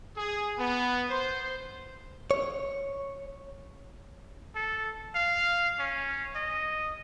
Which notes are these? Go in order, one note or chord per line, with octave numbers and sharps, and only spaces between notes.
G#4
B3
C5
C#5
A4
F5
C#4
D#5